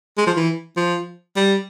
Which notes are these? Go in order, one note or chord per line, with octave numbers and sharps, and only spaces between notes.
G#3
F3
E3
F3
G3